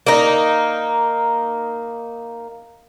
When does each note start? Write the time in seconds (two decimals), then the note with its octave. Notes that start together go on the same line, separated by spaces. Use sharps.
0.07 A#3 D#4